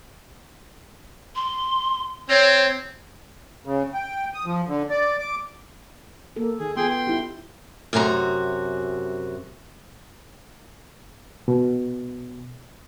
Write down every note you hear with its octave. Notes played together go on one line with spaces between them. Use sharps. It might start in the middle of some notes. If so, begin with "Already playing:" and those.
C6
C4 C#5
C#3
G5
D#6
F3
D3
D5
D6
A#3 A4
D#3 G#4
B3 F4 G#4 G5 C6
G5 C6
D#4 E4 G4
F#2 C3 F#4 G#5 A#5
B2